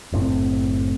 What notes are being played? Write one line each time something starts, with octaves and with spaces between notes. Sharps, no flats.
F#1 A2 C4